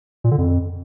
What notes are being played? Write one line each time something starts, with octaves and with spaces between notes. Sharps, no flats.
A#2
D3
F2